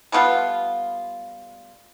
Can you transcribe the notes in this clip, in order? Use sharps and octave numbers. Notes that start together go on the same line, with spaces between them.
G3 A3 B3 F4